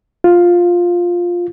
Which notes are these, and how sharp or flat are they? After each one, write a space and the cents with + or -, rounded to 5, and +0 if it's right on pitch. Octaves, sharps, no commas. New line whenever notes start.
F4 +5